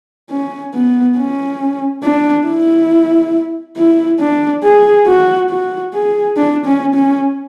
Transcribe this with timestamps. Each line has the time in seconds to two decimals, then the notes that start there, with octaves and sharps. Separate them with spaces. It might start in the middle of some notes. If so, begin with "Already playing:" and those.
0.31 C#4
0.74 B3
1.17 C#4
2.03 D4
2.47 E4
3.77 E4
4.20 D4
4.64 G#4
5.07 F#4
5.50 F#4
5.94 G#4
6.37 D4
6.66 C#4
6.95 C#4